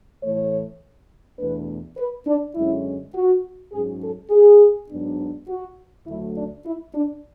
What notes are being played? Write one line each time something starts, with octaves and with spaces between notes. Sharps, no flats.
A2 E3 A3 C#5
E2 B2 A3 D4 B4
B4
D4
F#2 D3 G#3 C#4 E4
F#4
G#2 F#3 C#4 G#4
A4
G#4
G#2 F#3 B3 D4
F#4
D2 D3 F#3 A3 E4
D4
E4
D4